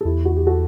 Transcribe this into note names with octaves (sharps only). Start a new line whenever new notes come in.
A4
E2 E4 G4
F#4
G4
F#4 A4